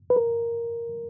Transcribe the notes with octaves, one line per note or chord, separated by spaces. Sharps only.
B4
A#4